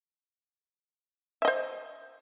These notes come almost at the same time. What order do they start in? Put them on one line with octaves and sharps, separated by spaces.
E5 D#5 C5